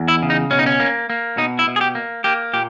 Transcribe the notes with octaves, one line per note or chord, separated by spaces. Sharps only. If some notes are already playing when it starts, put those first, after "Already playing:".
Already playing: E2
E4
C#3
D#4
B2 C#4
D#4
C#4
A#3
A#3
B2 D#4
E4
B2
G#4
G4
A#3
A#3 G4
A#2 G4